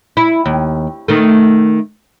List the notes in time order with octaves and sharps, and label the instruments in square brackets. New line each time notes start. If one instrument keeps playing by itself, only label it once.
[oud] E4
D#2
D#3 A3